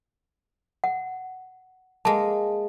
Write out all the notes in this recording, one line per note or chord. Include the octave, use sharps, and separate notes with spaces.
F#5
G#3 A#3 A5